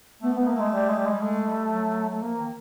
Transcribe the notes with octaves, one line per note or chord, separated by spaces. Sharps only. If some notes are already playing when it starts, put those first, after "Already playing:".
A3 B3
A3 B3
A#3
G#3 A3
G3
G#3
G3
G#3
G3
G#3 A3
G3
F#3
A3
F3 A#3
D#3